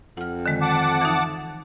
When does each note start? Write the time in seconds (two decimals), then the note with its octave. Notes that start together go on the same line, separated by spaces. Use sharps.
0.17 F2 F#5 F6
0.46 D3 D#3 G#3
0.61 F#5 A5 D6
1.01 E3 D#4